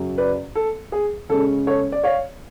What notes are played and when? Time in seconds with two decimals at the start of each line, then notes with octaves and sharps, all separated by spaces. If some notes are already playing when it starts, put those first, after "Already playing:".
Already playing: F#2 C#3 F#3
0.18 B4 D5
0.55 A4
0.92 G#4
1.29 C#3 G#3 C#4 A4
1.67 A4 C#5
1.92 D5
2.04 C#5 F5